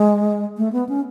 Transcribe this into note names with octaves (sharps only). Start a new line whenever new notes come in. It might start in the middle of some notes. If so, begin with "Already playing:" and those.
Already playing: G#3
A3
B3
C#4